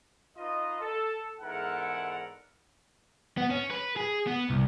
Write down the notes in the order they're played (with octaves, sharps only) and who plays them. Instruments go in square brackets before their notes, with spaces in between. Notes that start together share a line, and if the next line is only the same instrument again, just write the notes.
[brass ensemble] D#4 F4 B4 D#5
A4
E2 G#2 E4 A4 A#4 F#5
[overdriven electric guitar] B3
C#4
B4
G#4
B3
C2